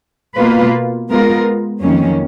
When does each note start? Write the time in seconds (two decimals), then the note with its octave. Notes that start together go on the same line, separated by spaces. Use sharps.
0.37 B2 A#3 F4 B4
1.09 G#3 B3 F4 A#4
1.81 F2 D#3 F#3 A#3 C#4